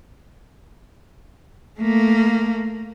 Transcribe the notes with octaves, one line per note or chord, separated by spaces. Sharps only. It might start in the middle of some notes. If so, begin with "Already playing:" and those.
A3 A#3